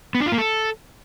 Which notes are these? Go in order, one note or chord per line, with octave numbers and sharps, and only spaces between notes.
B3
D4
F4
A#3
A4